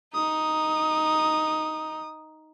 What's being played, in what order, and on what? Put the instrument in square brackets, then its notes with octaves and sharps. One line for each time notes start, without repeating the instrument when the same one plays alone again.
[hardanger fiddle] D#4 [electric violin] D#6